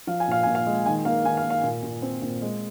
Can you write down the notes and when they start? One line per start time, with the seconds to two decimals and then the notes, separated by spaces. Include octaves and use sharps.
0.07 F3 F5
0.20 G#5
0.28 A#2 F5
0.43 A#2 G#5
0.55 F5
0.66 G#3
0.86 D#3 G#5
1.05 A#3 F5
1.25 D#3 G#5
1.37 F5
1.44 A#3
1.50 F5
1.64 A#2
1.83 A#2
2.02 C4
2.22 A#2
2.42 G#3